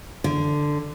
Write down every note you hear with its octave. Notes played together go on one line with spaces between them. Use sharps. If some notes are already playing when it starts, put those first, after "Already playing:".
D3